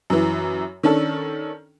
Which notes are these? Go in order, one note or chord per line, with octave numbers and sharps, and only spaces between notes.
F#2 E3
D#3 C#4 D4 A4